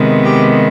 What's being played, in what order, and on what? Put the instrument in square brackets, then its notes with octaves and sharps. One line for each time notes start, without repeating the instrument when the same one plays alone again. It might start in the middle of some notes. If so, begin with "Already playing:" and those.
Already playing: [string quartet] C3 D#3 G#3 B3
G4